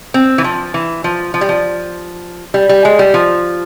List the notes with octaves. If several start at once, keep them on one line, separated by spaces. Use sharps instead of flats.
C4
E3
F3
E3
F3
F3
G3
F3
G3
G3
G#3
G3
F3